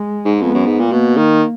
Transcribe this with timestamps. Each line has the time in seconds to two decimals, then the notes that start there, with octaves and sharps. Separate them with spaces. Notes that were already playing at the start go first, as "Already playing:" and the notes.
Already playing: G#3
0.25 G#2
0.42 F2 B3
0.55 F#2
0.66 G#2
0.79 A#2
0.92 B2 A#3
1.17 D#3